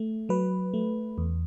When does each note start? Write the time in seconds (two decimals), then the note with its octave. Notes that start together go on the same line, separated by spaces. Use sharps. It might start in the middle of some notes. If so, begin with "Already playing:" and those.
Already playing: A3
0.29 F#3 B4
0.74 A3
1.18 E2